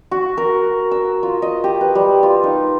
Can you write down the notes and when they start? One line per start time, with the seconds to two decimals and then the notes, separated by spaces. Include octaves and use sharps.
0.11 F#4
0.37 A#4
0.91 E6
1.23 F4
1.42 D#5
1.64 G4
1.81 B4
1.95 G3
2.23 F4
2.43 D#4